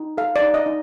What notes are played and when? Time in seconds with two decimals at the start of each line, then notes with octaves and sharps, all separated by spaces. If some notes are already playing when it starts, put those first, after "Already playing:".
Already playing: D#4
0.17 A4 F5
0.36 D5
0.42 D#4
0.54 D#5
0.66 D#4